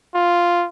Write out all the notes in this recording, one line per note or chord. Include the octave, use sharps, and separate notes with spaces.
F4